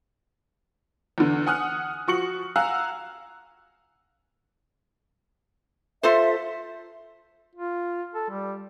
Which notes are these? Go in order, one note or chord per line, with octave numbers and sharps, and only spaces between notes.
E2 D3
F#5 G#5 D#6 F6 F#6
F3 F#4 C#6 C#7 F#7
F5 F#5 G#5 A#5 E6 F#6
F4 A4 C5 E5
F4
A4
G3